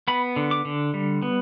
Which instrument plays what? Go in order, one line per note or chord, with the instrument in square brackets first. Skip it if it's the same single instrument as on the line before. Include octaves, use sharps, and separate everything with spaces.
[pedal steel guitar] B3 B5
D3
D6
D3
G3
B3